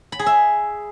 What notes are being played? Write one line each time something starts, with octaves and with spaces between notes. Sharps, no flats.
B5
G#4
E5